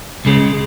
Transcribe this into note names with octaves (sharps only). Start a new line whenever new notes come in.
C#2 C#3 G#3